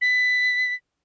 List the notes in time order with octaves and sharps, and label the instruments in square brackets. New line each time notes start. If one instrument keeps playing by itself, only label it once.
[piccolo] B6